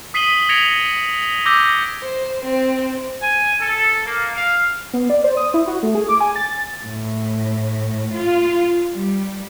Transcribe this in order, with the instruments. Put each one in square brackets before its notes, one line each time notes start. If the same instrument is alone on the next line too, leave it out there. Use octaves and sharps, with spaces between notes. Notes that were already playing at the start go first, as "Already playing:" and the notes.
[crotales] D#6 B6 C7 D#7 F#7 G7
G#6 A#6 C#7 D7 F7 G7
D6 E6 G6 A#6 G7
[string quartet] C5
C4
[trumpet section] G#5
A4
A#3
F5
[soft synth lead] B3
D5
C5
D#6
E4
F#4
A3
G#4
D6
G#5
A6
[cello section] A2
F4
G3